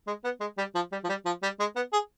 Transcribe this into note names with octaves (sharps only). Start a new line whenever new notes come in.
G#3
B3
G#3
G3
F3
G3
F3
G3
F3
G3
G#3
B3
G#4